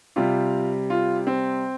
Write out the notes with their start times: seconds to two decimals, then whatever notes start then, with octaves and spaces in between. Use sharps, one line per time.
0.16 C3 G3 F4
0.90 F4
1.27 C4